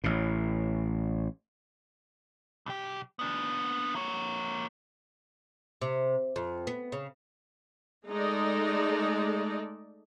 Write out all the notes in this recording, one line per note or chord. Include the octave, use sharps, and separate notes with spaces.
A1 A2
B1 G4
B3 D4
A#3 C#5
C3
F2
B3
C#3
G#3 A3 D#4 A4 D5 D#5